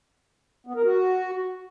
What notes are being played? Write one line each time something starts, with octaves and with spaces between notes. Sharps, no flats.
B3
A#4
F#4